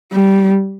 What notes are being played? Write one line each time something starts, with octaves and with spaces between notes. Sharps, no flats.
G3